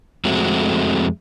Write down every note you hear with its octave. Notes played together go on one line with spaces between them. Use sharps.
F2 G#3 A3 C4 F#4